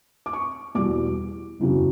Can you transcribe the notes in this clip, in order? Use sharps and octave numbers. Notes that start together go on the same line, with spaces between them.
D6
C#6
E2 B2 G3 D6
F#1 E2 C#3 F#3